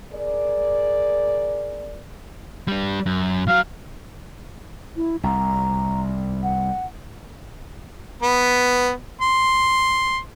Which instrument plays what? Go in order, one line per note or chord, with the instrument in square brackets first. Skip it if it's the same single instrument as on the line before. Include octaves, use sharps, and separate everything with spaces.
[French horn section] G#4 A#4 D5
[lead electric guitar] G3 D4
F#2
[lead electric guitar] F#3 F#4 [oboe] F5
[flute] E4
[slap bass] C2 [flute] A#5
[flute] F#5
[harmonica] B3
C6